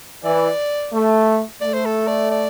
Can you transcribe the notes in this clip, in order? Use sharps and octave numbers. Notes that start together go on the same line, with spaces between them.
E3 D5
A3
A3 D5
C5
A4
D5
D5